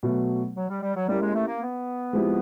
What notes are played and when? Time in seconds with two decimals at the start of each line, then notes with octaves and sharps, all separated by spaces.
0.03 B2 F#3 A3
0.55 F#3
0.69 G3
0.82 G3
0.95 F#3
1.08 G3 A#3 C#4 E4 G4 A#4
1.21 G#3
1.34 A3
1.47 A#3
1.61 B3
2.13 F3 G#3 C4 E4 G4